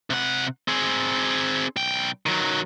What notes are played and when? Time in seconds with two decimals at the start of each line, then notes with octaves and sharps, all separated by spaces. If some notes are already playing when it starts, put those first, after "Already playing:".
0.10 C3 F#5
0.68 C4 G#4
1.76 B1 G5
2.26 D#3 F#3